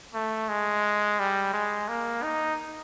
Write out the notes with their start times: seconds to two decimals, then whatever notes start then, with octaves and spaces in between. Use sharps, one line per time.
0.14 A3
0.49 G#3
1.19 G3
1.53 G#3
1.88 A#3
2.23 D#4